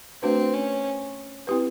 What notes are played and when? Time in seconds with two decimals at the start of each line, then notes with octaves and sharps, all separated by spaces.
0.22 A3 C4 D4 F#4 B4
0.54 C#4
1.47 C4 E4 G4 B4